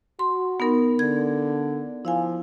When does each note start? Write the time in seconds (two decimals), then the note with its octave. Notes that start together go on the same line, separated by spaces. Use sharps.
0.19 F#4 C6
0.60 B3 D#4 A#4
0.99 D3 G#6
2.05 F3 E4 F5 G#5